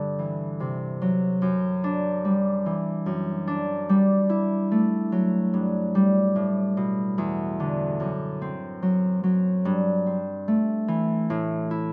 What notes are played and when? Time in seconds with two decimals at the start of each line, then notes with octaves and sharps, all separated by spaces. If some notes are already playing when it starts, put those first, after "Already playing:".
Already playing: G2 D3
0.19 E3
0.60 C3
1.02 F#3
1.42 F#2
1.84 D4
2.25 G3
2.66 E3
3.06 F#2
3.47 D4
3.89 G3
4.29 E4
4.71 A3
5.12 F#3
5.54 G2
5.95 G3
6.36 A2
6.77 B2
7.18 E2
7.60 D3
8.00 F#2
8.42 C4
8.82 F#3
9.24 F#3
9.65 G2
10.07 C4
10.48 A3
10.88 E3
11.30 A2
11.71 E4